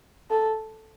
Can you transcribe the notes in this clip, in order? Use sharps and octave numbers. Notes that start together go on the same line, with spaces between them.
A4